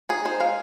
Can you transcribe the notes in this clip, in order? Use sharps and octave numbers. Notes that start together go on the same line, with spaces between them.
D#4 G#4
D#4 C5
G#3 F5